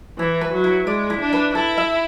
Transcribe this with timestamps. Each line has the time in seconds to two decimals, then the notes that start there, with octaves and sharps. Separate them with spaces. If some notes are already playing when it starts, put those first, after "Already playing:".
0.19 E3 E4
0.41 B4
0.53 F#3
0.64 E4
0.87 G#3 D5
1.10 E4
1.21 D4
1.33 B4
1.55 E4 A4
1.78 E5